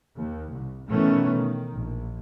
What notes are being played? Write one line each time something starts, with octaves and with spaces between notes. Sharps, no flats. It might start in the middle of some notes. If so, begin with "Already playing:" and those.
D#2
C2
B2 D#3 E3 A3 B3 C#4
D#3
A#1